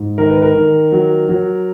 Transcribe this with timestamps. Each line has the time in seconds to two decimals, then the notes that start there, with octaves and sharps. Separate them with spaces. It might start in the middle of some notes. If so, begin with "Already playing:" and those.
Already playing: G#2
0.18 D#3 A#4
0.30 B4
0.42 A#4
0.55 D#3
0.92 F#3
1.29 F#3